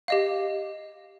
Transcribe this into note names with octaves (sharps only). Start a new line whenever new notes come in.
G4 D#5 F5